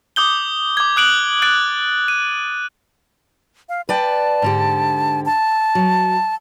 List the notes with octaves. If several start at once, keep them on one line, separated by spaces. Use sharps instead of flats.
D6 D#6 G6 G7
D6 G#6
D#6 F#6 D7 F#7
F#6 A6 D7
D#7
F5
B4 D5 G5 A5
G#2 D3 G4
A5
F#3